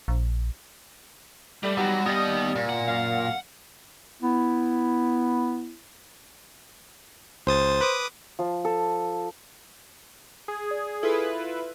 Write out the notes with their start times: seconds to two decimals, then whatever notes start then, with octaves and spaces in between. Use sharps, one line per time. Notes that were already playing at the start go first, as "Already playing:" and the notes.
0.08 A#1
1.63 G3 A3 G4 D5
1.77 F#3 B3 D#4 G4
2.06 D#2 G3 B3 D#5
2.56 A#2
2.69 F#5
2.88 F#2 F5
4.23 B3 E4
7.47 C#2 C5 D#6 A6
7.81 B4 D6 D#6
8.39 F3
8.65 A4
10.48 G#4
10.71 D5
11.03 E4 F4 A4 B4